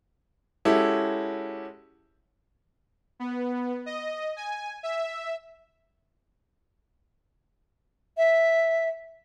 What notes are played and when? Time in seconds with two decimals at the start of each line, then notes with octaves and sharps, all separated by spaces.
0.65 G#3 C#4 E4 F#4 G4 A4
3.20 B3
3.86 D#5
4.36 G#5
4.83 E5
8.17 E5